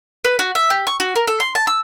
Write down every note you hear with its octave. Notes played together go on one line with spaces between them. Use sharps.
B4
F#4
E5
G4
C#6
F#4
A#4
A4
C6
A5
E6